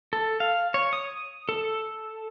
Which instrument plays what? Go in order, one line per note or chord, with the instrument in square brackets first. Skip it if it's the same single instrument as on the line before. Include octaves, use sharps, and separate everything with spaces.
[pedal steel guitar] A4
F5
C#5
D#6
A4